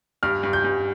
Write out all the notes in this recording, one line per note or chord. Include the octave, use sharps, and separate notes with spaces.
G2 F6
G2
G6
G2